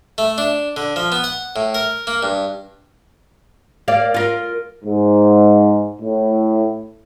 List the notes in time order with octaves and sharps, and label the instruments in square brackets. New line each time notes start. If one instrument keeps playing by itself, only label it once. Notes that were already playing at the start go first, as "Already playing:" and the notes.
[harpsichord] A3
D4
D3
F3
B3
F#5
A2
A#4
A#3
G2
[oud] A#3 D5 F5
F4 A#4
[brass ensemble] G#2
A2